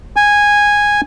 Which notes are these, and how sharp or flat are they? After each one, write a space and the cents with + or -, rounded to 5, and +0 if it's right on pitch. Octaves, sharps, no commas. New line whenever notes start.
G#5 -10